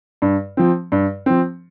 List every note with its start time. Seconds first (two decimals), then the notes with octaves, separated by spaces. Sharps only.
0.22 G2
0.57 F3 C4
0.92 G2
1.26 F3 C4